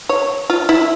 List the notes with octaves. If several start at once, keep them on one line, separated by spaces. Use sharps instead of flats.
C#5
F4
E4